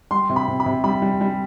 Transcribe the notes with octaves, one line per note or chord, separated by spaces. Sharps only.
G3 C6
C3
B5
C3
B5
C3
G3 B5
G3
G3